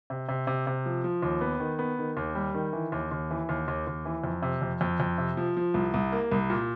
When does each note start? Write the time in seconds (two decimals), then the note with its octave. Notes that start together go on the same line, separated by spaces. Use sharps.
0.10 C3
0.29 C3
0.47 C3
0.67 C3
0.86 F3
1.04 F3
1.22 D#2
1.41 B3
1.60 D#3
1.79 B3
1.99 D#3
2.17 D#2
2.35 G3
2.54 D#3
2.73 E3
2.92 D#2
3.11 D#2
3.31 E3
3.49 D#2
3.68 D#2
3.87 D#2
4.05 E3
4.24 F2
4.42 C3
4.62 F2
4.81 F2
5.00 F2
5.18 C3
5.37 F3
5.57 F3
5.74 C2
5.94 C2
6.12 A#3
6.32 C2
6.50 A#2